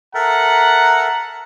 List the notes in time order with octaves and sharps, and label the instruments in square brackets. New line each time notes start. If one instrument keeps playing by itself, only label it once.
[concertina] A4 A#4 E5 [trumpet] F#5 [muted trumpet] A#5